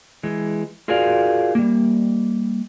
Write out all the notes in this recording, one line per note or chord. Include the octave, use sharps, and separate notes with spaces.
E3 G#3
F4 F#4 G#4 A#4 D5 F5
G3 A#3